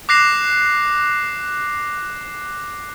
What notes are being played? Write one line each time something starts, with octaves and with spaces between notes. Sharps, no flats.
D6 F#6 A#6 C7 E7 F7